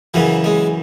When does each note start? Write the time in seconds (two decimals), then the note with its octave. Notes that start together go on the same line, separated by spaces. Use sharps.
0.14 F#2 C#3 E3 F#3
0.44 G#3